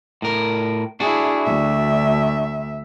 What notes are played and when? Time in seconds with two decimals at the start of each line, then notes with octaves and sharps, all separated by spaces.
0.22 A2 A#4
1.00 D4 E4 F#4 G#4
1.44 D2 E5